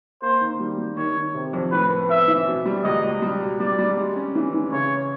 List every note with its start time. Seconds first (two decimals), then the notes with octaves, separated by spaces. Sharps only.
0.22 A#3 C5
0.41 D#3
0.60 G3
0.78 G3
0.97 D#3 C#5
1.16 D#3
1.34 C3
1.53 F2
1.72 A2 B4
1.90 B3
2.10 B3 E5
2.28 E3
2.47 B2
2.66 G3
2.84 C#2 D#5
3.04 C#2
3.22 G3
3.41 B2
3.60 G3 D5
3.79 G3
3.97 G#3
4.16 C#4
4.35 E3
4.53 E3
4.72 C#3 C#5